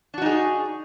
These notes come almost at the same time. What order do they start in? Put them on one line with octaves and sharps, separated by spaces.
D4 F#4 D#4 G#4